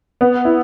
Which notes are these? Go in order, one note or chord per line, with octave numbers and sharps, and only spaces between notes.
B3
E4